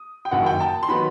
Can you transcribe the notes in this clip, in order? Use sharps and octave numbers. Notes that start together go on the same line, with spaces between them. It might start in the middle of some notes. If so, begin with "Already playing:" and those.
Already playing: D#6
G5
F#1 F#2 D#3 F#5
G5
A5
C6
D#3 F#3 B3 D#4 B5